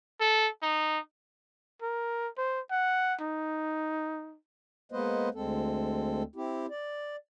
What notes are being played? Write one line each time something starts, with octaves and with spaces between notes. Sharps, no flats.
A4
D#4
A#4
C5
F#5
D#4
G#3 A#3 B3 B4 C5 D#5
D2 G#3 C4 A4
C4 E4 G4
D5